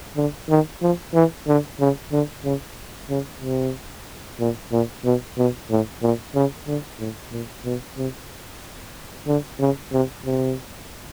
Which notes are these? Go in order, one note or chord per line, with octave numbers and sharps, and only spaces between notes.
D3
D#3
F3
E3
D3
C#3
D3
C#3
C#3
C3
A#2
A#2
B2
B2
A2
A#2
C#3
D3
A2
A#2
B2
C3
D3
C#3
C3
C3